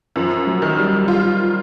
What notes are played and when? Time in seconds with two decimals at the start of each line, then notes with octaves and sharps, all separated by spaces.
0.16 F#2 F3
0.47 F#3
0.62 D#3
0.77 G3
1.08 F4